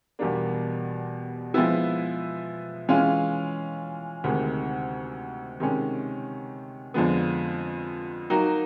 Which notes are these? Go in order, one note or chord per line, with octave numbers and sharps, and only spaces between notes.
E2 B2 G3 A#3 D4
F3 G#3 B3 E4
E3 G#3 C#4 F4
D2 C3 D#3 G#3
C3 D#3 G#3 C#4
F2 D3 F3 G#3 B3
F#3 A#3 D#4 F#4